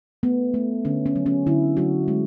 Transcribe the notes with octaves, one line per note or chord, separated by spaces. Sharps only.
A3 B3
A3
D3 C#4
C#4
F#3
C#4
D3 E4
F#3 F#4
G#3